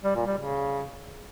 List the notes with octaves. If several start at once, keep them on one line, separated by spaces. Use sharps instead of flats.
G3
A#2
G3
C#3